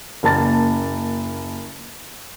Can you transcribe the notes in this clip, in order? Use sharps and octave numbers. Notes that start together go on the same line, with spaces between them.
F#1 A#3 A5 A6